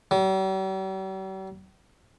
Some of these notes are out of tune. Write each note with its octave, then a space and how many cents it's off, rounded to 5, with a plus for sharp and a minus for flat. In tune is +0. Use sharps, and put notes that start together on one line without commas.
G3 -45